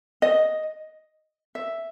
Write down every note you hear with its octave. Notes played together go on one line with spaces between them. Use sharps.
D#5
E5